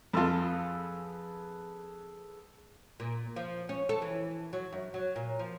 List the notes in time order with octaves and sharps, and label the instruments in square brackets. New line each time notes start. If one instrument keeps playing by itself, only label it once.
[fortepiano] F2 F4 [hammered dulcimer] G#4 A4 B4
[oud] A#2
F3
C#4
A4
E3
F#3
F#2
F#3
A#2
F3